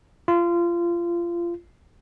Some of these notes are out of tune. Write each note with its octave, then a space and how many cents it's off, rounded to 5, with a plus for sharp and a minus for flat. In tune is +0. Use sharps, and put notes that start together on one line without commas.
F4 -25